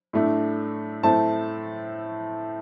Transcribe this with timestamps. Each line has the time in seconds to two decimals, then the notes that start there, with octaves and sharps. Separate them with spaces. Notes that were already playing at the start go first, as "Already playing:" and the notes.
0.13 A2 A3 D4
1.03 A2 A3 C4 A5